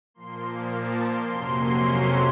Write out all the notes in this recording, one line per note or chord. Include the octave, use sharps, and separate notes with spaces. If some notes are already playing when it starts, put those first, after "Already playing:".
A#2 F3 A#3 C6
A5
C6
F2 C3 F#3 A#3 C#4